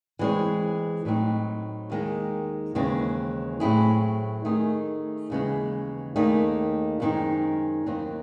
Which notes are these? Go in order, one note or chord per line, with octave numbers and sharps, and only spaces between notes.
E3 G#3 C4 F#4 C#5
A2 F#3 C4 D#4
D#2 D#3 G#3
D#2 C#3 E3 G#3 C4
A2 F#3 C4 E4 G#4
D#3 A3 C4 D#4 G#4
D#2 C#3 E3 G#3
D#2 D#3 A3 D#4 G#4
F#2 D#3 G#3 C4 D#4
D#2 D#3 F#3 C4